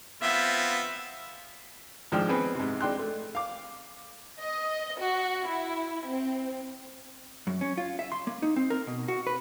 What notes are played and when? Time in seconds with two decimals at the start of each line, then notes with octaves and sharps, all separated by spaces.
0.22 B3 C4 F4 E5
2.12 G#2 F3 G#3 D4 G5 F6
2.29 B3 C4 G#4
2.55 G#2 C3
2.81 G#3 D4 G5 C6 F#6
2.99 A3
3.35 F5 D6
4.41 D#5
4.98 F#4
5.45 E4
6.09 C4
7.47 F#2
7.61 C#4
7.78 F4
7.99 E5
8.12 C6
8.27 A#3
8.42 D#4
8.56 C4
8.70 A#4
8.87 B2
9.08 F#4
9.27 B4